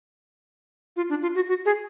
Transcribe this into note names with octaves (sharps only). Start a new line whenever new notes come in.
F4
D4
F4
F#4
F#4
G#4